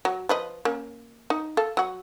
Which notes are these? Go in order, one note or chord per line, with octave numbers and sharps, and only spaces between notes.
F#3
F3 B4 D#5
A#3 C#4
D#4
A4 F5
F#3 F#4